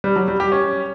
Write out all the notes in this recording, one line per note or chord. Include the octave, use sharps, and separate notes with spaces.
G3
F#3
G3
G4
C#4